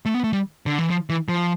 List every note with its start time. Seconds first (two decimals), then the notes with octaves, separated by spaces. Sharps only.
0.06 A3
0.14 B3
0.24 A3
0.33 G3
0.66 D3
0.79 E3
0.90 F3
1.10 E3
1.29 F3